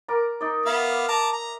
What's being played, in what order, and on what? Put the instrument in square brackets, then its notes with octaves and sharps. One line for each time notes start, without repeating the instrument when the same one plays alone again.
[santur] A#4 D5 A#5
D#4 D5
[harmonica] B3 F5 [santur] E5
[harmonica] A5 A#5 D6
A#5